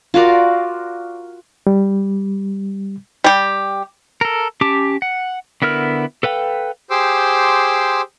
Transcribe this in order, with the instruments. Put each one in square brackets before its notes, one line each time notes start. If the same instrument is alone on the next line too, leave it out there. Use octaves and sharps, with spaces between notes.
[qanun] F4 F#4 A#4 D5
[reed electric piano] G3
[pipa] G3 G4
[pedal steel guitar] A4 A#4
C#4 G4 A5 D6
F#5
D3 B3 E4 A#4 F6
A4 B4 F5 G5
[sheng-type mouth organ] G4 G#4 C5 C6 D6 E6